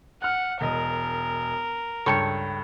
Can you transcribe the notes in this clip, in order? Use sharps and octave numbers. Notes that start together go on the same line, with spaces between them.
F#5 F6 F#6
E1 A#4 D#5
C#2 G2 A4 C#5 G5 C#6